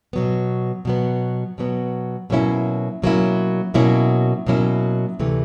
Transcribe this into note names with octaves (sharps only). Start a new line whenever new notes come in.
B2 F#3 B3
B2 F#3 B3
B2 F#3 B3
B2 F#3 A#3 C#4 E4
B2 F#3 A#3 C#4 E4
B2 F#3 A#3 C#4 E4
B2 F#3 A#3 C#4 E4
D2 C3 E3 A3